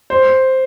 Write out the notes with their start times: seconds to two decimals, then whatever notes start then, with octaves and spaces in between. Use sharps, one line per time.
0.10 C5